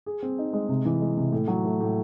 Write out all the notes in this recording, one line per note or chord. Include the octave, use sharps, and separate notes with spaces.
G#4
C4
D#4
G#3
C3
E3
G#3
C3
A2
F#3
A3
A2